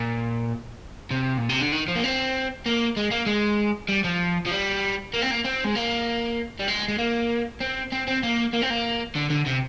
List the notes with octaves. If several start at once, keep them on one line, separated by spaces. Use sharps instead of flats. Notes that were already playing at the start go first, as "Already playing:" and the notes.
Already playing: A#2
C3
A#2
C3
D3
D#3
F3
A#3
C4
A#3
G#3
A#3
G#3
G3
F3
F3
G3
A#3
C4
A#3
C4
G#3
A#3
G3
G#3
G#3
A#3
C4
C4
C4
A#3
A#3
C4
A#3
D3
D3
C3